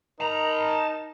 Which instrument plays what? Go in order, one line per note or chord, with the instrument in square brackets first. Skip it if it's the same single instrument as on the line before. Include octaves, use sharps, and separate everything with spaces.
[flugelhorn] D#4 [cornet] A#4 [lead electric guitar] A5 A#5